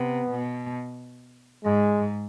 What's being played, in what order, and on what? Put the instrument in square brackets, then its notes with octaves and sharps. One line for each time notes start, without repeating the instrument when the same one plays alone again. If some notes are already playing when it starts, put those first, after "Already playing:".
Already playing: [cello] C3 [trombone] B3
[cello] B2
[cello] G#2 [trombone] G#3